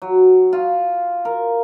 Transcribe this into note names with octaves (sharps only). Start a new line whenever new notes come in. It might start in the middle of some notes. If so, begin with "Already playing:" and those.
F#3
F4
A#4